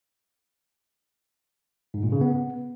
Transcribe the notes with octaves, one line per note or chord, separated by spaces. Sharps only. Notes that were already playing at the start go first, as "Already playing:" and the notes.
G#2
A#2
C#3
B3